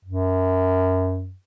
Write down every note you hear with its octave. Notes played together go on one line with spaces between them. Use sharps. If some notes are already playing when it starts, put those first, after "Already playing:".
F#2